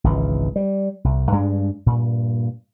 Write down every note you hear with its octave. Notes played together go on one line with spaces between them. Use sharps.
G#1 C#2 E3
G3
C2
G2 G#3 C4 D4
G2 A#2